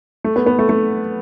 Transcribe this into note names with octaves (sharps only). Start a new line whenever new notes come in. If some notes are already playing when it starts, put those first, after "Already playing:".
A3
B3
B3
A3
A3